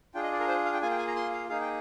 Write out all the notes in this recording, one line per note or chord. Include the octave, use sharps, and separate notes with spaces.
D4 F4 G#4 G5
D#5
D5
A#4
C5
F5
G5
A#3 F4 G#4 G#5
G5
G#5
A#5
C6
F5
A#3 D#4 G#4 F5
G5